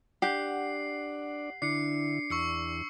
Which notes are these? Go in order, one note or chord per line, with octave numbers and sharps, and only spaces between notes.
D4 G4 D5 F#5 C7
D3 D4 E4 C7 C#7
E2 C#6 E6 C#7